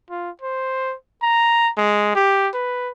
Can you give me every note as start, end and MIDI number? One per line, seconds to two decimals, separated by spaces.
0.10 0.30 65
0.42 0.95 72
1.22 1.70 82
1.78 2.13 56
2.15 2.48 67
2.54 2.91 71